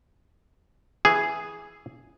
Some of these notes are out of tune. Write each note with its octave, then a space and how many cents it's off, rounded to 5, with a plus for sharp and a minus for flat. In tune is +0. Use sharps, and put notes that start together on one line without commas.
E3 +0 G#4 +0